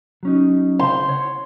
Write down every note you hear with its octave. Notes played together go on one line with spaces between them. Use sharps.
F#3 C#4 D#4
C#3 C5 F5 C6
C#5 F#5